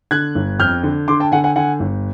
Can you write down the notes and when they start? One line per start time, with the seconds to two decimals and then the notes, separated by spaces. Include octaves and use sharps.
0.11 D3 F#6 G#6
0.35 G1
0.59 F2 F6 G6
0.83 D3
1.08 D3 C6 D6
1.20 G5 A5
1.32 D3 F#5 G#5
1.44 F#5 G#5
1.56 D3 F#5 G#5
1.80 G1